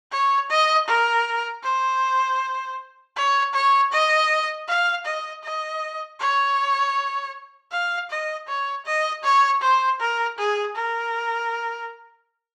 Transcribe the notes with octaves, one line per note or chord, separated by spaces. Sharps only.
C#5
D#5
A#4
C5
C#5
C#5
D#5
F5
D#5
D#5
C#5
F5
D#5
C#5
D#5
C#5
C5
A#4
G#4
A#4